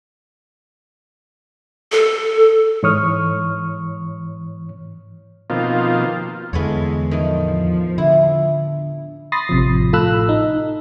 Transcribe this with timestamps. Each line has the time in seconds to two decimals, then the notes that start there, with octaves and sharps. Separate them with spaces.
1.92 A4
2.83 G#2 E3 C#5 C#6 D#6 F6
5.50 B2 D#3 F3 A#3 C4 F4
6.53 E2 D3 E3 G#3 B3 A4 C#5
7.11 A2 D#3 F3
7.98 D3 E4
9.32 B5 C6 D#6 A6 A#6 C7
9.49 A1 C3 F3
9.93 A2 F4 A4 B5 E6 F#6
10.29 D#4